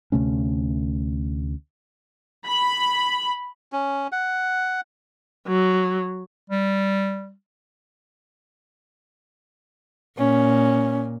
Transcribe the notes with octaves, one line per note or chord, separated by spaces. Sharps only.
D2 C3 A3 C#4
B5
C#4
F#5
F#3
G3
A#2 C#4